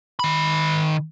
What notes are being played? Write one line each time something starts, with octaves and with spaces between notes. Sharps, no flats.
D#3 B5